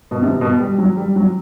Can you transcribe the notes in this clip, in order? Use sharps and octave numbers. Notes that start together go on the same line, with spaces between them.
B2
C3
B2
G3
F#3
G3
F#3